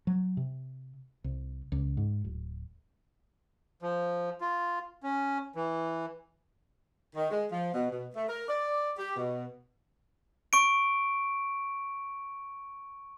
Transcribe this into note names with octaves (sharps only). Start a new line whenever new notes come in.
F#3
C3
C2
C#2
G#2
D1
F3
F4
C#4
E3
D#3
G#3
F3
B2
B2
A3
A#4
D5
G4
B2
C#6 D7